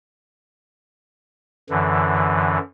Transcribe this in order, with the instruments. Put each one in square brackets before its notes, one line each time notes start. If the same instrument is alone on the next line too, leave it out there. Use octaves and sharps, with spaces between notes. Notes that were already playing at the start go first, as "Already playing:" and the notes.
[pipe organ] F#2 D3 E3